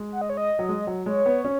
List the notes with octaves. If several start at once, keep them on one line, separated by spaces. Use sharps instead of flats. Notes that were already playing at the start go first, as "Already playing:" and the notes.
Already playing: G#3
F#5
D#5
C#5
D#5
F#3
G#3
F#3
G#3 C#5
B3
C#4